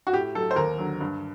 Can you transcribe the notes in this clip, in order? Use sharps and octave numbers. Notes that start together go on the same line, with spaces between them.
F#4
A2 G4
F#3 A4
C5
D#2 A#4
D3 F#3
G2